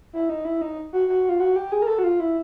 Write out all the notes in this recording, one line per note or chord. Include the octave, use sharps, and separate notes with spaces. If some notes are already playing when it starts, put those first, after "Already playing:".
E4
D#4
E4
D#4
F#4
F#4
F4
F#4
G4
G#4
A#4
A4
F#4
F4
E4